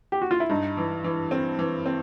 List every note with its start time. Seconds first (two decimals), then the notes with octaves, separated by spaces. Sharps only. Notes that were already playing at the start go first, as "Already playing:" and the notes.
0.12 G4
0.22 F#4
0.31 F4
0.40 E4
0.49 G2 D#4
0.77 E3
1.04 E3
1.31 C4
1.59 E3
1.86 C4